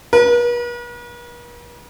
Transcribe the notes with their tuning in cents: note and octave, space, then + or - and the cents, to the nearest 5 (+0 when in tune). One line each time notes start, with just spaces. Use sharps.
B4 -45